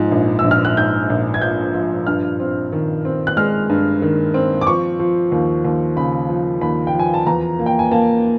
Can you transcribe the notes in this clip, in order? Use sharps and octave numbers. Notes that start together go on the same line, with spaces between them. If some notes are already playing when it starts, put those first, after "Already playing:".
Already playing: G#2 F3
A#1
E6
A#1
F6
F#6
G#2 G6
A#1
G#6
F3 G6
F3
G2 F6
C4
D#3
C4
F#6
G#3 F6
G2
D#3
C4
D6
F3 C#6
F3
D#2
D#2
C#3 B5
F3
D#2 B5
G5
F3 G#5
A5
E2 A#5
A#3
G5
G#5
A#3 A5